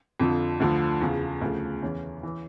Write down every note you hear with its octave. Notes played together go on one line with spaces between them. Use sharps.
F2 D3 F3
D2 D3 F3
E2 C#3 F3
D2 C#3 F3
E2 E3 C#4
E3